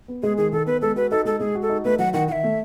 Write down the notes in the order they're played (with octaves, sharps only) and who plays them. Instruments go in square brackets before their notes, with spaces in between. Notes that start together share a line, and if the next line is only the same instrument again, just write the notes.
[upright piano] B3
[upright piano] G#3 [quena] G#4
[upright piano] D#3 [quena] G#4
[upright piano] D#3 [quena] A4
[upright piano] B3 [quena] B4
[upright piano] G#3 [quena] A4
[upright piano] F#4 [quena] B4
[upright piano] D#4 [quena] A4
[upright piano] G#3 [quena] A4
[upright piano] G#3 [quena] G#4
[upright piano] F#4
[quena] A4
[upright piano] D#4
[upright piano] A3 [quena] B4
[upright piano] F#3 [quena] F#5
[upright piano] D#3 [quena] F#5
[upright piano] D#3 [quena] E5 F#5
[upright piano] A3